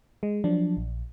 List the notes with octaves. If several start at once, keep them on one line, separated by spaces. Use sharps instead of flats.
G#3
F3 F#3 D4
A#1